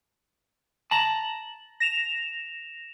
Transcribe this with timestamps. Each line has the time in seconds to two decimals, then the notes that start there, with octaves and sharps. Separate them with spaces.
0.91 A5 A#5 F#7
1.80 A#6 E7 F7